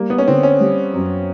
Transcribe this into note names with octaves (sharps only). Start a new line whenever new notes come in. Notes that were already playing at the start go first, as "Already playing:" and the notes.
Already playing: G3 A#3
B3
C#4
D3 C4
C#4
G3
F#2